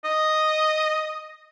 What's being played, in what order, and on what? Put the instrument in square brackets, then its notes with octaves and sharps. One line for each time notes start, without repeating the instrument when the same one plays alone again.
[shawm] D#5